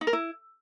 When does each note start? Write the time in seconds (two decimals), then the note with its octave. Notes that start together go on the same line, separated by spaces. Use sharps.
0.01 D#4
0.07 A#4
0.13 E4